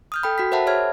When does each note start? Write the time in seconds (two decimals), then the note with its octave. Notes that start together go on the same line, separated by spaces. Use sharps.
0.12 D#6 F6 G6
0.23 A4 G5 B5
0.38 F#4 B5 B6
0.52 A#4 C5 E5 F#5 A5 B5
0.67 G#4 C#5 E5 F6 G#6